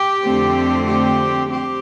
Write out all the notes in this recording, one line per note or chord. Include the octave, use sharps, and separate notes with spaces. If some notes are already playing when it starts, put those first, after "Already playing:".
Already playing: G4
F2 D3 A3 C4
G4
C4 G4